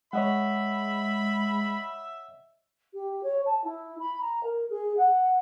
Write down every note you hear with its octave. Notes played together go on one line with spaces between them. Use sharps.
G#3 C#5 D#5 E5 F#5 B5
G4
C#5
A5
E4
B5
A#5
A#4
G#4
F#5